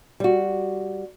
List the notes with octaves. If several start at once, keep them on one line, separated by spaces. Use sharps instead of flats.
G3 F#4